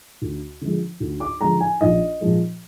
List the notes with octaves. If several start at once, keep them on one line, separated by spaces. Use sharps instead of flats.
D2
D3 F3 G#3
D2
D6
D3 F3 G#3 A#5
G#5
A#1 D#5
A#2 F3 G#3